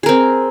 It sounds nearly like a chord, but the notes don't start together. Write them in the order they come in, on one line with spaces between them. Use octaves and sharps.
G#4 A#4 C4